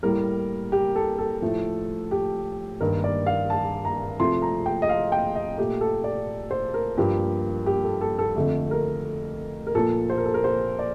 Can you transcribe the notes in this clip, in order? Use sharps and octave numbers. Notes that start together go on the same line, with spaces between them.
A2 G3 A#3 A#4
G4
A4
A4
A2 F3 A3
G4
G2 D#3 A#3 A#4
D5
F5
A5
A#5
C3 F3 A3 C6
A#5
G5
D#5
F5
G5
D#5
A#2 A3 G4
A4
D5
C5
A#4
G2 F3 A#3 G4
G4
A4
A4
A4
F2 D3 A3
A#4
A#4
A#2 F3 A#3 A4
C5
A#4
A4
A#4
C5
D5